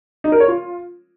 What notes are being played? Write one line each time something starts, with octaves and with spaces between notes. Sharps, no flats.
D#4
A#4
C#5
F4